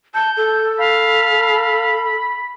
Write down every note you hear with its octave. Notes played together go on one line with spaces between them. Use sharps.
A5 G6
A4
F5 B5